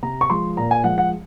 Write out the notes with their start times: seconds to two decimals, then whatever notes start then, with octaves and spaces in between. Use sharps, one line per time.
0.02 C3 A#5
0.21 C#6
0.30 F3 G#3 C6
0.57 A#2 A#5
0.71 G#5
0.84 F3 G#3 F#5
0.98 F#5